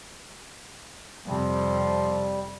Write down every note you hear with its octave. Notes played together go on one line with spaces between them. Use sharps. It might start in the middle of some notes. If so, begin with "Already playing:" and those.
F2 C3 F3 G3